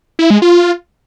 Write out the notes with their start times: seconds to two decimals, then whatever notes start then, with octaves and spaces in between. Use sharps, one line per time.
0.19 E4
0.30 G#3
0.42 F4